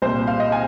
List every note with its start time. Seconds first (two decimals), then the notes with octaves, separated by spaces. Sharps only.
0.02 C2 A#2 C5
0.27 F5
0.40 D#5
0.52 G#5